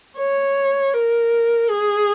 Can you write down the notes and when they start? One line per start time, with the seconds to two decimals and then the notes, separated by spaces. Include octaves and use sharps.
0.18 C#5
0.94 A#4
1.69 G#4